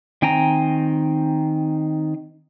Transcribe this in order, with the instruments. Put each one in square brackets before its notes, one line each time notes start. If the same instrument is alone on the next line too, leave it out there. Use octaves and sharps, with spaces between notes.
[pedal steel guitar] D#3 C4 G5 G#5 A#5